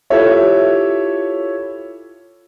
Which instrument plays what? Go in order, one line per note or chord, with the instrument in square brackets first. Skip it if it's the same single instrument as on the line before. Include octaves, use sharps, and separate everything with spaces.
[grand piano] E4 F4 G4 A4 C#5 E5